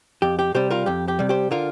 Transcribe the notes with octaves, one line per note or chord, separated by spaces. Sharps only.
F2 G4
G4
C3 G3 G4 C5
F4 A#4
F2 G4
G4
C3 G3
G4 C5
D3 F4 A#4